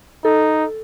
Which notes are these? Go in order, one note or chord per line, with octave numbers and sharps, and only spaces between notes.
D#4 A4